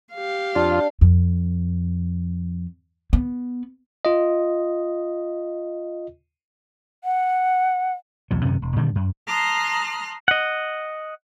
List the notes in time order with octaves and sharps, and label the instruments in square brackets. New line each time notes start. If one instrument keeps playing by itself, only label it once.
[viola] G4 F5
[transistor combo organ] F2 F4 [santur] D4
[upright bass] F2
B3
[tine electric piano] F4 D#5
[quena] F#5
[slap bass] B1 E2 F#3
F#2 C3 D#3 C#4
E1
A#2 D3 D#3 G3
F#2
[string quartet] A5 A#5 C6 D#6 F6 F#6
[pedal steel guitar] D#5 F#5